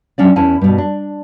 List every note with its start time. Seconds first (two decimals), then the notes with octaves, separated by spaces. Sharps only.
0.18 F#3 C#4 D4 D5
0.36 E2 C#4 E4 G#5 A5
0.61 G2 B2
0.78 D4